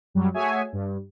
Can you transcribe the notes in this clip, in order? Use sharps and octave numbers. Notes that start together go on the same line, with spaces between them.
F#2 F#3 G3
A3 F#4 G#4 C#5 E5 G#5
G2